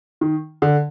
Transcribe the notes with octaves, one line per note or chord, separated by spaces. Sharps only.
D#3
D3